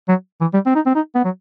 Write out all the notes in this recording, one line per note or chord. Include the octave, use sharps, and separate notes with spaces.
F#3
E3
G3
C4
D#4
C4
D#4
B3
F#3